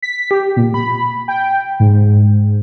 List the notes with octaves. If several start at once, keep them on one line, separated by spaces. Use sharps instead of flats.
B6
G4
A#2
B5
G5
G#2